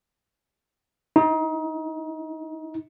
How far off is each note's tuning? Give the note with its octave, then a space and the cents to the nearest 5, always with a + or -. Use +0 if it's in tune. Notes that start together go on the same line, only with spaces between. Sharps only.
D#4 +30